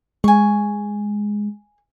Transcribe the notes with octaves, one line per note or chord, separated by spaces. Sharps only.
G#3 G#5 C#6